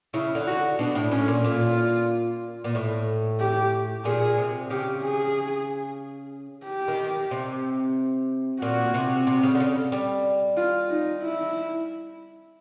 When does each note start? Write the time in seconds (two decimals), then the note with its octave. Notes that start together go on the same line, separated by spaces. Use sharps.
0.14 C#3 E4
0.35 D3
0.47 F#4
0.79 B2 D4
0.95 A2
1.11 A2 C#4
1.28 A#2
1.44 A#2 F4
2.64 A#2
2.75 A2
3.40 G4
4.05 A#2 G#4
4.38 C3
4.70 C#3 G4
5.02 G#4
6.65 G4
6.88 D#3
7.31 C3
8.61 A#2 F#4
8.94 C3
9.27 C3
9.43 C#3
9.55 D3
9.60 C#3
9.92 G3
10.57 F4
10.90 D#4
11.23 E4